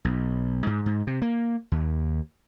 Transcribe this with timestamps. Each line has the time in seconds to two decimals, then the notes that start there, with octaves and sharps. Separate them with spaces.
0.05 B1
0.67 G#2
0.86 G#2
1.07 C3
1.22 A#3
1.72 D#2